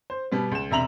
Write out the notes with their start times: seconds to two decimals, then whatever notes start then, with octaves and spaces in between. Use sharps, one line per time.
0.10 C5
0.32 B2 G3 B3
0.52 C#2 E7
0.71 E1 C3 E5 A#5 F7 F#7